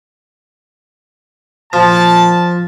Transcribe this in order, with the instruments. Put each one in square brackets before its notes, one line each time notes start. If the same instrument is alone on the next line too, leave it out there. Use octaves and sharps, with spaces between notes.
[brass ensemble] A#2 A5 [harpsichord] F3